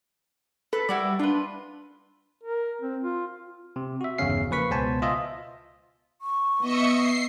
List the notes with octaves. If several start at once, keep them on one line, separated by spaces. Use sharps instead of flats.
A4 B4
G3 E4 F#4 D5
D4 F4 B4
A#4
C4
F4
C3
F#4 E5
G1 E2 C#3 C#4 F5 C7
F3 A#3 B4 C#6 B6
C#2 B2 B3 C5 G#5 A5
F4 D#5 E5
C#6
B3 D#5 E5 C#7
C7